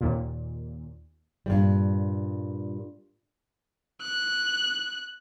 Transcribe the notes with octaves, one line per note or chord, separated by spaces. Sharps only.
D#2 A#2
G2 A#2 G3
F#6